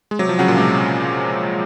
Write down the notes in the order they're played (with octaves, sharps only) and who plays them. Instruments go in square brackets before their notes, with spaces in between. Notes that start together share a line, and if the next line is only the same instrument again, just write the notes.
[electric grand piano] G#3
[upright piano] C3 [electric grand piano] F#3
[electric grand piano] F3
[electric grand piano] C#3 [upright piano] F#3 C#4 F#4
[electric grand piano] A#2
[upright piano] C3 [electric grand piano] G#3